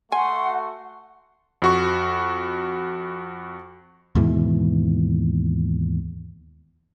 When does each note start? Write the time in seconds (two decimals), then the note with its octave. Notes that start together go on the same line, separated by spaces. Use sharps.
0.12 A3 F#4 F#5 G#5 C6
1.62 F2 F#4 C#6
4.15 D#2 G#2 B2 E3